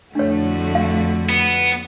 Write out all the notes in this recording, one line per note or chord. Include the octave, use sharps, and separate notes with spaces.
F2 A2 D3 A3 D4 F#4 C#5
F5
B3